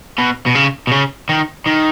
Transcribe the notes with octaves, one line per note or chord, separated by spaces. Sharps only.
B2
B2
C#3
B2
C#3
D#3
D#3